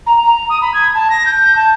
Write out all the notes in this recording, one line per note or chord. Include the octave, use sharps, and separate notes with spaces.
A#5
A#5
D#6
B5
G#6
A5
A#6
G6
A5